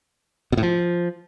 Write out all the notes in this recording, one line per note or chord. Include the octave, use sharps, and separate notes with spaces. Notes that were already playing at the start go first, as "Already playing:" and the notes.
B2
A2
F3